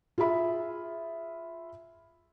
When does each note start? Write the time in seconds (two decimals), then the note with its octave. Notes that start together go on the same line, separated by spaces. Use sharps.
0.18 F4 G#4 E5 B5